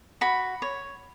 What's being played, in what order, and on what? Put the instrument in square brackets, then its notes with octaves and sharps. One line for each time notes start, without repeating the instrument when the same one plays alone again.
[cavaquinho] F#4 B5
C#5